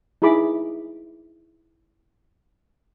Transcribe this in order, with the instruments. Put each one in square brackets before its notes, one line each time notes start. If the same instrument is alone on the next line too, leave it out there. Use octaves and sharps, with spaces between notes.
[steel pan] D#4 E4 G#4 B5 D6